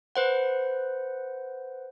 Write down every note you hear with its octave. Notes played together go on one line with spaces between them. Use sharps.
B4 C5 F#5